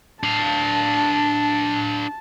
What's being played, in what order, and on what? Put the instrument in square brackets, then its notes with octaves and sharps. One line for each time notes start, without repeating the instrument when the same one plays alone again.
[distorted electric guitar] D4 F5 [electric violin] A5